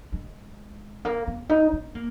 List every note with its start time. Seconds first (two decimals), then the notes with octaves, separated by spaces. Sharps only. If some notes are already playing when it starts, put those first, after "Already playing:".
0.12 G#3
1.05 A#3
1.27 C4
1.49 D#4
1.72 C#4
1.95 A#3